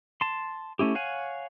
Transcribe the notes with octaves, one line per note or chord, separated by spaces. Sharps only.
A5 C6
A3 C#4 E4 G4
C#5 F5 F#5 G#5